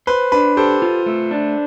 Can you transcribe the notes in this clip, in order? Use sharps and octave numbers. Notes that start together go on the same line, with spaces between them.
B4 C5
D4 B4
G4 A4 C5
F4
A3
D4